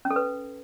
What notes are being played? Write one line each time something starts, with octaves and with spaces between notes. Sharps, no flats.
C#4
A4
B4